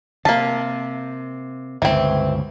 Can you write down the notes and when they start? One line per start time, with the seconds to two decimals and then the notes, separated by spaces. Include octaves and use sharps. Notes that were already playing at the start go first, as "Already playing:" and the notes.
0.25 C3 A#3 A5
1.82 G1 C#2 E3 C4